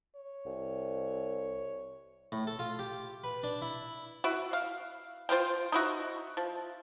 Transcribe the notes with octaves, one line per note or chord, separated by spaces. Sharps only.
C#5
C2
A2
A4
F4
G4
B4
D4
E4
E4 F#4
F5
F4 C5 F5 G5
D#4 E4 F#4
F3